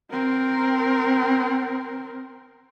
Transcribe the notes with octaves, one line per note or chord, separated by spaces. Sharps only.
C4 A#4